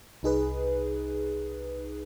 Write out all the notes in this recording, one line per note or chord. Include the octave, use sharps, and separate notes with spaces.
C2 D#4 G#4 B4